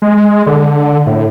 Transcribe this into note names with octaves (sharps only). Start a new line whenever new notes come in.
G#3
D3
A2